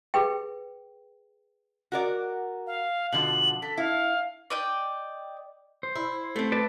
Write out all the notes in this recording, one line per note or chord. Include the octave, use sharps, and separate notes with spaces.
G#4 B4 G5
F#4 A#4 D5
F5
B2 D3 F3 F#7
A4 B6
E4 F5
D5 D#5 G5
C5
E4
A3 C4
B4 D5 A5